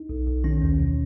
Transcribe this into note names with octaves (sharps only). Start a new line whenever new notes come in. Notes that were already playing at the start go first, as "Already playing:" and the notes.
Already playing: D#4
B1
B1
D#3 C#4
D#2
B2